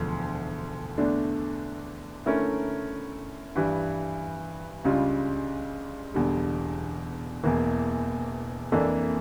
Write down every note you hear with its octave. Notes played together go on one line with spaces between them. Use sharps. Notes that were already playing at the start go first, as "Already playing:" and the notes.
Already playing: E1 D2 D3 F3
E2 D3 A3 D4
D3 A3 C#4 E4 A#4
G2 E3 G3
C#2 C#3 G3 D4 F4
E1 E2 D3 G3
E1 E2 E3 A#3
F2 E3 A#3 D4 A4